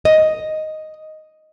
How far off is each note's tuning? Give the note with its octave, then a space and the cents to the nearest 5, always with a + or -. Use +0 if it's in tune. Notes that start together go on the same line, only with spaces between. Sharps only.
D#5 +0